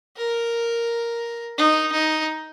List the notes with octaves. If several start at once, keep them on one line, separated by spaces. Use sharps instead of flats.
A#4
D#4
D#4